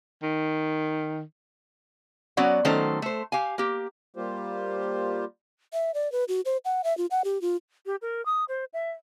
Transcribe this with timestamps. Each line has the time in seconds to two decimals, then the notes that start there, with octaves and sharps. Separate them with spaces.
0.23 D#3
2.37 F#3 B3 C#4 F#4 D5 F#5
2.65 D#3 F#3 A3 C#4 A4 C5
3.02 A3 C5
3.32 G4 F5 G#5
3.58 A#3 G4
4.16 G3 A#3 F4 G4 C5
5.73 E5
5.94 D5
6.12 B4
6.28 F#4
6.45 C5
6.65 F#5
6.84 E5
6.98 F4
7.11 F#5
7.24 G4
7.42 F4
7.86 G4
8.02 A#4
8.26 D#6
8.49 C5
8.73 E5